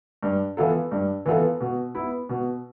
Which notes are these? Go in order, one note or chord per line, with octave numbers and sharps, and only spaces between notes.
G2
E3 B3 F4 A4
G2
E3 B3 F4 A4
B2
B3 E4
B2